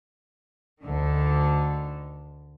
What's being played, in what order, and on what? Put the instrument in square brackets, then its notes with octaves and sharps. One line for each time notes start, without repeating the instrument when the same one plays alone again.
[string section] D2 D3 D#3